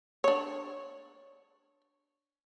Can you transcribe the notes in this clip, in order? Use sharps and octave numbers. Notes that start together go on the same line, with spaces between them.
D4 C#5